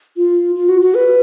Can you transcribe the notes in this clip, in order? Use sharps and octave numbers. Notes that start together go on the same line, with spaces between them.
F4
F4
F#4
F#4
B4